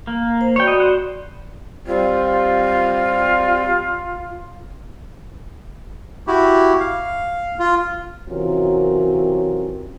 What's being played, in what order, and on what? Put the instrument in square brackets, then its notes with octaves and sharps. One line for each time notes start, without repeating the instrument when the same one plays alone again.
[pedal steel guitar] A#3
[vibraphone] C5
[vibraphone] F#4 D5 B5 [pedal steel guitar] C#5 G5
[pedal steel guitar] D#5
C5 F#5
[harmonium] G3 C4 [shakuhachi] F4
[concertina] E4 F#4 G4
F5
F4
[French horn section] C3 E3 F#3 C#4 F4 A#4